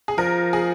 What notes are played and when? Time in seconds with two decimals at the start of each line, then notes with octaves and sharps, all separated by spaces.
0.08 G#4
0.18 F3 A#4
0.53 G#4